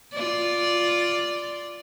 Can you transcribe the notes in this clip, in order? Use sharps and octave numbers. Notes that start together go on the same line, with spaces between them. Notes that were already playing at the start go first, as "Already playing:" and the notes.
F4 D5